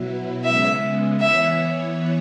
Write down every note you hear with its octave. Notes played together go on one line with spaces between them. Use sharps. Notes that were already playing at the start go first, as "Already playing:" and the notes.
Already playing: B2 F#3 B3 E4
C#3 G#3 B3 E5
E3 B3 E4 C#5 E5